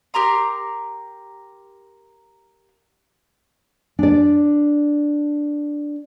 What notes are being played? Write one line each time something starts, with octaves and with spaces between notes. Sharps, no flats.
G4 A#4 A#5 C6
D4 D5